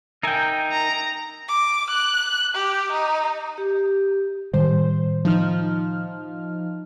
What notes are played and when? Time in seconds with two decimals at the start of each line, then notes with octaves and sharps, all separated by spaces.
0.23 D#4 A#4 E5 G5 G#5
0.72 A#5
1.49 D6
1.90 F#6
2.55 G4
2.92 D#4
3.58 G4
4.54 A2 D#3 G3 C5
5.25 F3 D#4 F6